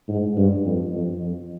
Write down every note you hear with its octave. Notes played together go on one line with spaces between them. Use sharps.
G#2
G2
F2
F2
F2